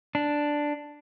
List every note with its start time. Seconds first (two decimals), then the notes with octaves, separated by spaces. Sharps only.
0.15 D4